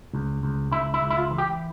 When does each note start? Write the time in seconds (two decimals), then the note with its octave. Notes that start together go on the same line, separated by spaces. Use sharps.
0.13 C#2
0.43 C#2
0.72 C#2 E4
0.94 E4
1.01 C#2
1.10 E4
1.17 F4
1.31 E3
1.38 G4